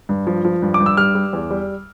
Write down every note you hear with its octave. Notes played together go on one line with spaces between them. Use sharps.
G2
F3
F3
G2
D6
G2
E6
G3 F6
G3
E2
G3